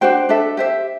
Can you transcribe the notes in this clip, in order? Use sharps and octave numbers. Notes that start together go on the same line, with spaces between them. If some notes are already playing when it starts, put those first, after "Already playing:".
D4 F#4 C5 G5
D4 A4 E5
G4 C5 E5